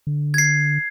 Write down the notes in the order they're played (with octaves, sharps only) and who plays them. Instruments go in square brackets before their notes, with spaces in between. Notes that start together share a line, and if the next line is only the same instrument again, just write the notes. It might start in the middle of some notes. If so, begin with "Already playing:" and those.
[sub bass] D3
[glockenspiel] G#6 C7